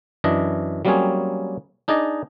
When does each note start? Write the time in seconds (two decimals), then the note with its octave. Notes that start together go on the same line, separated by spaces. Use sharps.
0.24 F#2 E3 D4 D#5
0.85 F#3 G3 A#3 C4 C#4 G#4
1.88 D4 D#4 G#4 D5 D#5